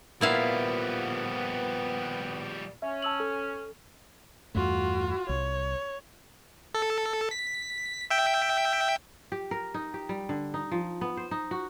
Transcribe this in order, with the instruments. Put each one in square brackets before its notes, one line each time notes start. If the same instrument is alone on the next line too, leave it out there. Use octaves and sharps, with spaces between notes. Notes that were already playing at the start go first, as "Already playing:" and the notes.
[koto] A#2 E4 F5 [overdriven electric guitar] F3 G3 [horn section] B3
[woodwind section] C#4 [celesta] E5
[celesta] A5 E6 F#7
A4
[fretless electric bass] E2 G2 A3 [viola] F4 F#4
[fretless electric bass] C2 [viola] C#5
[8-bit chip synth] A4
B6
E5 G5
[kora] G4
A#4
D#4
G4
G3
D3
D#4
F3
B3
C5
D#4
F#4